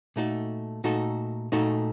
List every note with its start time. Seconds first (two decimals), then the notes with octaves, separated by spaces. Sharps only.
0.16 A#2 A3 D#4 F#4 A4
0.84 A#2 A3 D#4 F#4 A4
1.52 A#2 A3 D#4 F#4 A4